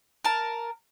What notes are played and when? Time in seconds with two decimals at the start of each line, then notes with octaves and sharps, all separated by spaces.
0.25 A#4 A5